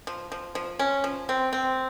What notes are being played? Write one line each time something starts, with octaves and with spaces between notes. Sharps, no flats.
F3
F3
F3
C#4
F3
C4
C4